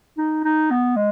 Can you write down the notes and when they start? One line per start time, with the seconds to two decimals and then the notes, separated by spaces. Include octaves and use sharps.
0.17 D#4
0.44 D#4
0.70 B3
0.96 G#3